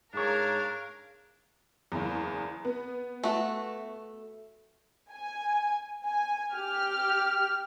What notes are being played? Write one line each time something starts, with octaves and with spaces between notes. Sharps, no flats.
G#2 D4 G#4 A#4 C#5 F5
F#1 E2
B3
A3 F#4
G#5
G#5
G4 F6